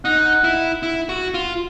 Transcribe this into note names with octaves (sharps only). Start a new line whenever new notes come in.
D#4 F#5
E4
E4
F#4
F4